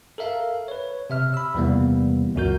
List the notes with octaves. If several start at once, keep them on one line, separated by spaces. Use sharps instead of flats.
A4 A#4 E5 F5
B4 C#5
C3 E5 F6
B5 E6
E2 C3 E3 G3 A#3 B3
C#2 F#2 A#2 F#4 A#4 G6